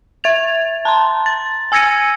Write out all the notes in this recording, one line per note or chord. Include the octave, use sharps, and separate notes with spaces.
E5 G#6 A6 F7
A5 A#5 C6
A6
G#5 E6 G#6 A#6 C#7 D#7